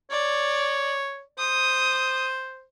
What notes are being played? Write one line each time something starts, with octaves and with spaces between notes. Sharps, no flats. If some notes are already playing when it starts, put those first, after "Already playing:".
C#5 D5
C5 D#6